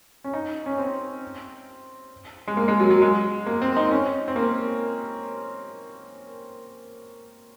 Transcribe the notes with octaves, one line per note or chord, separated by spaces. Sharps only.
C#4
D#4
C#4
C4
G#3
A#3
G#3
F#3
F#3
G#3
A#3
C4
D#4
C#4
C4
A#3